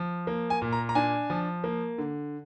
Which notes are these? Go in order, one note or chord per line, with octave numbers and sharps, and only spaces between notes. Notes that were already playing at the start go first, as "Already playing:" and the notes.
Already playing: F3
A#3
G#5
A#2
A#5
A#5
D4 G#5
F3
A#3
D3